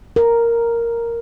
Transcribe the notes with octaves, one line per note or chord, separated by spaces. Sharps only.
A#4